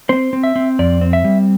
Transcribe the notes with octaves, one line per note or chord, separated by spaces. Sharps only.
C4 C5
C4
E5
C4
F2 D5
C4
E5
G3